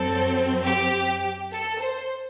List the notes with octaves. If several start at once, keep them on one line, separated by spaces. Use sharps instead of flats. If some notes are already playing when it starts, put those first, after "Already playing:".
Already playing: F#2 F#3 C4 A4
G4
A4
C5